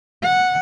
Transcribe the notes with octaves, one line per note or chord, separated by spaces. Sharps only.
F#5